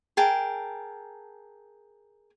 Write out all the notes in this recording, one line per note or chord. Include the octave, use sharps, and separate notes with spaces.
G#4 A#4 G5 A5